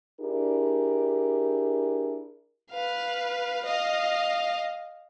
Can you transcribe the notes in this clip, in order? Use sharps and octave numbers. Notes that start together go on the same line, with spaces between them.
D4 E4 G4 G#4 A#4
B4 F5
D#5 F5